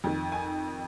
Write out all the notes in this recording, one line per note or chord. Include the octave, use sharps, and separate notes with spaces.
F2 D#3
G#5